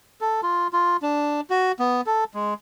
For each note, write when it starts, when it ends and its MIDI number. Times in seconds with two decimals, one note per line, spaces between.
0.21 0.41 69
0.43 0.68 65
0.73 0.97 65
1.02 1.41 62
1.50 1.72 66
1.79 2.01 59
2.06 2.24 69
2.35 2.54 56